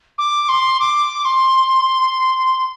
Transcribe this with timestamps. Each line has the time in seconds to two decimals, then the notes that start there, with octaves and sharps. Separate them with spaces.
0.18 D6
0.48 C6
0.79 D6
1.25 C6